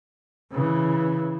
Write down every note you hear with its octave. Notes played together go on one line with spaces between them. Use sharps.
C#3 E3